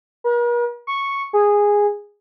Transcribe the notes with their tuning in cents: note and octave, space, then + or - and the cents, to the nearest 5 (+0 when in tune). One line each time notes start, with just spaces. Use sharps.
A#4 +45
C#6 -5
G#4 -10